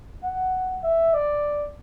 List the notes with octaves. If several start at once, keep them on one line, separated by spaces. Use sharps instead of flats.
F#5
E5
D5